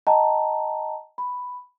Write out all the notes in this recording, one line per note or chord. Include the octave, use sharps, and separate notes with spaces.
D#5 G5 A5 A#5
B5